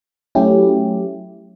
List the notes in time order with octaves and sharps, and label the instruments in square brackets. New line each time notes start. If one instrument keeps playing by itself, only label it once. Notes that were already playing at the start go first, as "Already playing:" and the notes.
[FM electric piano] F#3 A3 C#4 E4 G4